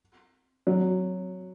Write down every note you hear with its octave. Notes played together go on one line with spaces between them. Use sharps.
F#3